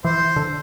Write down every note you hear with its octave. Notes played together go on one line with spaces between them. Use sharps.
E3 C5
D3